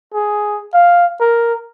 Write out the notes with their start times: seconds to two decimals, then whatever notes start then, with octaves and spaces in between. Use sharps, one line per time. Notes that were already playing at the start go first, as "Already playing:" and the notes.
0.14 G#4
0.73 F5
1.21 A#4